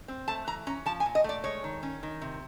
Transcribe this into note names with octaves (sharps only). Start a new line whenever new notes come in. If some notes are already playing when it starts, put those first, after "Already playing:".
C4
A3 A5
E3 A#5
C#4 A#5
F3 A5
G#5
A#2
D#5
A3 D5
G#3 C#5
D#3
C#4
D#3
C3